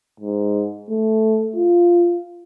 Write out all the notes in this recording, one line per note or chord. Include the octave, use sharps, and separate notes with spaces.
G#2
A3
F4